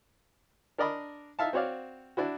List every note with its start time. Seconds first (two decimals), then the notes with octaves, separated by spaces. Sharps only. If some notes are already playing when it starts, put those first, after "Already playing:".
0.78 D4 A#4 D5 D#5 B5
1.39 D#4 E5 F5 A5
1.53 C4 F#4 C#5 D5 F5
2.17 D4 E4 F#4